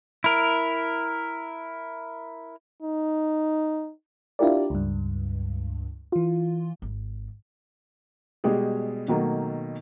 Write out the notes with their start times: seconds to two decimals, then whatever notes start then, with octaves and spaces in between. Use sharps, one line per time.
0.24 E4 A#4
2.82 D#4
4.39 D4 E4 F4 G4 A#4 D5
4.70 C#2 G2
6.12 E3 F4
6.82 G#1
8.44 B2 G3 G#3 G4 G#4
9.08 B2 D#3 F#3 A3 A#3